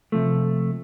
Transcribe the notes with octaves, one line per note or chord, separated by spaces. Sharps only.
C3 F3 A3